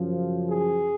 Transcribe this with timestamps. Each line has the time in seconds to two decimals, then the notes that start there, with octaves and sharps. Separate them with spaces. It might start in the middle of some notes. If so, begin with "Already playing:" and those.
Already playing: F#2 C#3 F3
0.48 G#4